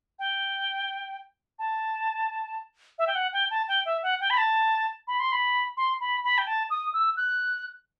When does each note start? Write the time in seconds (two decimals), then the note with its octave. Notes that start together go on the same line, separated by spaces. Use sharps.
0.19 G5
1.59 A5
2.99 E5
3.07 G5
3.15 F#5
3.33 G5
3.50 A5
3.68 G5
3.85 E5
4.03 F#5
4.20 G5
4.30 B5
4.38 A5
5.08 B5
5.20 C6
5.32 B5
5.77 C6
6.00 B5
6.24 B5
6.38 G5
6.47 A5
6.70 D#6
6.94 E6
7.17 F#6